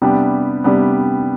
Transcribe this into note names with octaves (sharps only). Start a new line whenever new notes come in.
C3 G3 B3 D4 G4
C3 G3 B3 D4 G4